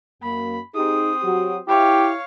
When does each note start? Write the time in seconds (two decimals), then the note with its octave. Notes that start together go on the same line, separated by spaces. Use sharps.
0.23 F#2 A#3 B5
0.75 C4 D#4 G4 G#4 D#6
1.23 F#3 F#4 G4
1.68 E4 G4 C#5 F5